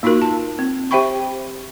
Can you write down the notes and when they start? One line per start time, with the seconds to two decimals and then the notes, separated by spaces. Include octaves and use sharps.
0.03 A#3 D#4 F4 F#4 A#4
0.22 A5
0.59 C4
0.91 G4 C5 E5 G5 B5 C#6